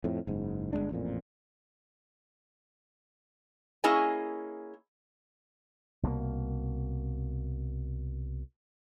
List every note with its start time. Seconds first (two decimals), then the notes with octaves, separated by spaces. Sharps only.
0.04 F2 A2
0.27 F#1 G#2
0.73 G1 G#2 G#3 D4
0.90 A1 F2 A#2
3.84 A#3 C#4 E4 G#4 D#5 G#5
6.03 C2 B2 G3 A#3